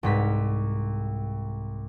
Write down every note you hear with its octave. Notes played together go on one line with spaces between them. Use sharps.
C2 G#2 B6